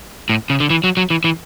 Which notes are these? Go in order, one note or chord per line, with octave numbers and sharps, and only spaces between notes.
A2
C#3
D3
E3
F#3
F#3
E3
E3